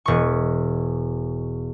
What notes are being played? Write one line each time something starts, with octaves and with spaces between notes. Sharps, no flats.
E1 C#6